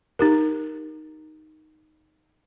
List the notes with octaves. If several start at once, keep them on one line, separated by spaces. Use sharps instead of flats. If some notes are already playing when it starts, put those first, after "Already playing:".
D#4 G4 A#4